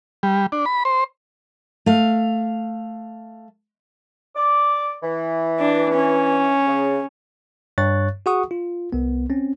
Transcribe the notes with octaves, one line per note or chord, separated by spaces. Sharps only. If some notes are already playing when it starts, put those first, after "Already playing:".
G3
D4
B5
C5
A3 F5
D5 D6
E3
D4
C#4
C#3
G2 C#5 C#6 F#6 A6
F#4 G#4 F#5 C#6 D#6
F4
C2 B3
C4 C#4